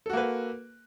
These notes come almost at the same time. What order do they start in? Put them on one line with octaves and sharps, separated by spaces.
A4 F#4 A#3 B4